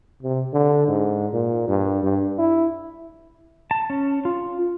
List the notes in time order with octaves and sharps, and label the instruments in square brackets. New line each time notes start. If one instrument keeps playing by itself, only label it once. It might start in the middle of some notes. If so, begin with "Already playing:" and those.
[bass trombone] C3
D3
G#2
A#2
G2
G2
E4
[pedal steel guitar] A5
C#4
F4